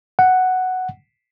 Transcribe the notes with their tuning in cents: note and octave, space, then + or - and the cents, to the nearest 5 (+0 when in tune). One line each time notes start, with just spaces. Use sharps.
F#5 +5